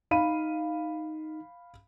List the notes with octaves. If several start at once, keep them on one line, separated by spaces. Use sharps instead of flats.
D#4 F5 B5 D#7